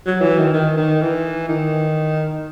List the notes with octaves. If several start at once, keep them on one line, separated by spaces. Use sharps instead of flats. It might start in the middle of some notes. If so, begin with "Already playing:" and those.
F#3
E3
D#3
D#3
D#3
E3
D#3